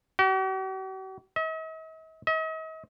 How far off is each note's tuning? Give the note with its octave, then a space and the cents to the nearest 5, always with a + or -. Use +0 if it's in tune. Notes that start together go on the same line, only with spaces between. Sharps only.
F#4 +45
D#5 +45
D#5 +40